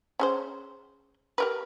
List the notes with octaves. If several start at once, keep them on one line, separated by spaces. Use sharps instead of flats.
C#4 G#4 C5
G4 A#4 B4